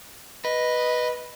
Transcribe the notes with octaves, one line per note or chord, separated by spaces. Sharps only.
B4 D#5